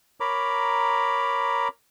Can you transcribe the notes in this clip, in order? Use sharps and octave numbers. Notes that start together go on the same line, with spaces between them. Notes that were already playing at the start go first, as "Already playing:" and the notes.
A#4 C#5 A#5 B5 D6